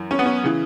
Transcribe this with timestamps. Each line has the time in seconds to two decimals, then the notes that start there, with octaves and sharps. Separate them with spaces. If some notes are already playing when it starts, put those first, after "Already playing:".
Already playing: F#2 E3
0.11 C#4
0.19 B3
0.26 C#4
0.44 C#3 E3